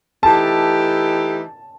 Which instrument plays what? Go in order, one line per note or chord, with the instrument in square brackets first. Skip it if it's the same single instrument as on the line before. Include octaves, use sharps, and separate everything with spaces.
[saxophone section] E3 A3 D#4 G4 [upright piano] A5